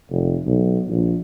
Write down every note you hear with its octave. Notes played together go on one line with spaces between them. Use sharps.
F1
B1
A#1